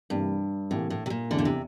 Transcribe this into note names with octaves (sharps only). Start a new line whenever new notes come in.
G2 C3 E3 G3 A#3
A2 C3 E3 G3 A#3
A2
C3
A#2
F1 E2 D3 E3
A#2
C3